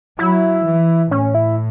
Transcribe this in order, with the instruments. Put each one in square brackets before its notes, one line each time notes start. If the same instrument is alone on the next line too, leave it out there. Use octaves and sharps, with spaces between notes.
[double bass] F#3 [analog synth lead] E4
[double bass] E3
[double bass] A2 [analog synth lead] C#4
[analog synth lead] E4